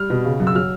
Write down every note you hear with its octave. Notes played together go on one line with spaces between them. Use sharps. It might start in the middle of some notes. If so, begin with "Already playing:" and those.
Already playing: G3 F6
B2
C#3
F#2
E6
F#3 F6